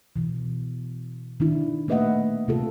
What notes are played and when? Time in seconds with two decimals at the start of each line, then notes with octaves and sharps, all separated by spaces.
0.16 B2 E3
1.40 D#3 D4 E4
1.88 A3 A#3 B4 D#5 E5 F#5
2.48 C3 F4 A4